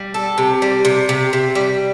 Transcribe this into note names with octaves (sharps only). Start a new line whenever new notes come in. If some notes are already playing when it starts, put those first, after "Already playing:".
Already playing: G3
A4
C3
G3
C3
C3
C3
G3